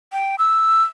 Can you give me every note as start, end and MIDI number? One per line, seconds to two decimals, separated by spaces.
0.13 0.36 79
0.39 0.83 88